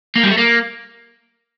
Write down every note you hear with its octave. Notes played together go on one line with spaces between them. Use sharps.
A#3
G3
A3
A#3